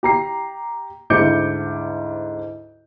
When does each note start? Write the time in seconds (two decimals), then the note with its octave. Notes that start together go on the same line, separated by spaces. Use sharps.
0.03 G4 A#5 C7
1.10 D2 G#2 E4 D6 G6 C#7